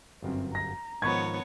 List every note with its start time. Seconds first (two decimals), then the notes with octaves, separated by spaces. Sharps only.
0.22 G1 F#2 C4
0.55 A#5 A#6
1.02 G#2 D#3 F3 B3 C#5 B5 C#6 G#6